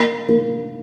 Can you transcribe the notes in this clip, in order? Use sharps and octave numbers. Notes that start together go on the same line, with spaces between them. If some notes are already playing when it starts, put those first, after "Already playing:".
Already playing: A#3
A#3